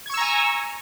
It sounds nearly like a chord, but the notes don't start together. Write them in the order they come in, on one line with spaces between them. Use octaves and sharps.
G#6 C#6 E6 A#5 G#5